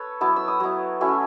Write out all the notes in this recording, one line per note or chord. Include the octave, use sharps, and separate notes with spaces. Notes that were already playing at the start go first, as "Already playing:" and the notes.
Already playing: A4 B4 C#5
F#3 B3 E4 A5
E6
D#6
F#3 B3 E4
F#3 A3 C#4 E4 C#6